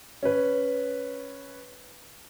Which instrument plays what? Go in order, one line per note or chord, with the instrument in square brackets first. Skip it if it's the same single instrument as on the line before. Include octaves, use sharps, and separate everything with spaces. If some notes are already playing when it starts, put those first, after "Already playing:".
[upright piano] C#4 B4